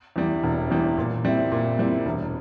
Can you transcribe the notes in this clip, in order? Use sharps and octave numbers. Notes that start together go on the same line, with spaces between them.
E2 E3 G3
E1
E2 E3 G3
A#2
G3 C4 E4
A#2
G3 C4 E4
E1